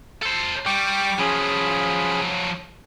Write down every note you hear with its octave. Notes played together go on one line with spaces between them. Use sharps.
A4 C5
G3 G5 C#6 D6
F3 F#3 C#4 G#4 B5